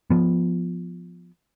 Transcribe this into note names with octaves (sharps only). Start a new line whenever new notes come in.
F3 B3